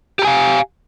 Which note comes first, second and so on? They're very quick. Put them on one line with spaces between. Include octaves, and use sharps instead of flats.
G4 A#5 G#5 F5